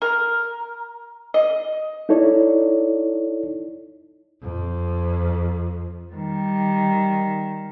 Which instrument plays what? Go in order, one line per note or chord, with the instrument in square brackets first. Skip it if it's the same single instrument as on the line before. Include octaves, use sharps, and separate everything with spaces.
[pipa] A#4
D#5
[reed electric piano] D#4 E4 A4 C#5 D5
[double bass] F2
[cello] D#3 G3